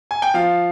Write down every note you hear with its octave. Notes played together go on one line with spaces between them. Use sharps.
G#5
G5
F3 F5